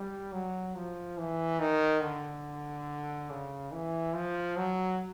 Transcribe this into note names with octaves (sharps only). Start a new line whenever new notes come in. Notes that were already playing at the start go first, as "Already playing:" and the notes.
Already playing: G3
F#3
F3
E3
D#3
D3
C#3
E3
F3
F#3